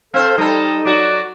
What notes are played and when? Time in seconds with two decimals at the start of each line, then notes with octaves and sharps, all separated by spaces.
0.14 C4 A4 C5 F5
0.38 G3 D#4 A4 D#5
0.85 F#3 F#4 D5